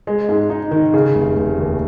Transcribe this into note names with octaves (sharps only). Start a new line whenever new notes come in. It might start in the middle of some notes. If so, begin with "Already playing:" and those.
G#3
G#2
D#4
D#3
C#3
F1
F1
D#2